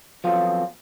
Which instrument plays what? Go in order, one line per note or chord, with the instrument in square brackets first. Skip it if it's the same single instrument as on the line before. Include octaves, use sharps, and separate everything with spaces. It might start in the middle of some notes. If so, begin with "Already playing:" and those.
[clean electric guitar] F3 F#3 B3 C4 F4 A4